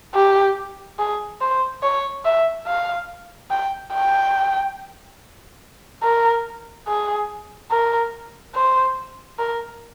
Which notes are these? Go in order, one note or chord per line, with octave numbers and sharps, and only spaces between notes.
G4
G#4
C5
C#5
E5
F5
G5
G5
A#4
G#4
A#4
C5
A#4